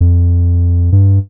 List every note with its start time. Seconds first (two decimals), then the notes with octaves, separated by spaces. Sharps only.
0.01 F2
0.92 G2